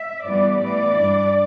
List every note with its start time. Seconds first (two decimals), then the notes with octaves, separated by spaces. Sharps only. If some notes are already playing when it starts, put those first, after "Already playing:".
Already playing: E5
0.24 G2 E3 G3 B3 D5
0.60 A2 E3 B3 D5
0.96 G2 G3 D4